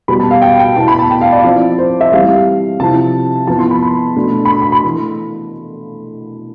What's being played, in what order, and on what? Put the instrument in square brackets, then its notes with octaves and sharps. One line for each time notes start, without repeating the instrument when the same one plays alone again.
[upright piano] B2 G3 B3 B5
A5
F5
G5
G5
B2 B3 E4 A5
B5
A5
G5
F5
D5
F3 C4 E4
C5
E5
E3 G3 C4 F5
C3 F3 C4 E4 A5
F3 B3 E4 A5
C6
B5
B5
B2 A3 D4
B5
C6
B5
B5
E3 A3